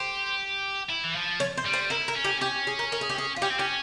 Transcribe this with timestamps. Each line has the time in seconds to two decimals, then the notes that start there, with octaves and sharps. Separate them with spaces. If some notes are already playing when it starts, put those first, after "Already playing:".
Already playing: G4 C5
0.90 E4
1.04 E3
1.16 F3
1.40 C#5
1.57 C5
1.66 G3
1.73 C5
1.90 E4 A#4
2.08 A#4
2.16 C#4
2.24 G4
2.41 C#4 G4
2.67 G#4
2.79 A#4
2.92 A#4
3.01 G#4
3.10 G4
3.18 G#4
3.36 F4
3.42 C#4 G4
3.50 C4
3.58 C#4 G4